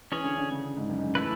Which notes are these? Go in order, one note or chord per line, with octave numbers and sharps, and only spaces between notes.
E3 C#4 G#4 C#5
D3
D3
C#3
G#2
F#2
G#2
F#2
E3 A3 E4 B4